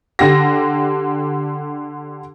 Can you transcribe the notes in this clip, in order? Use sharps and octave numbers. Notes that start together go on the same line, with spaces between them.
D3 G4 A#6